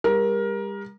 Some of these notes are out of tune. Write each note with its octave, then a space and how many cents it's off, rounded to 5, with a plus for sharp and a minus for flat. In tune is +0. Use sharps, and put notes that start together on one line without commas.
G3 +40 A#4 +20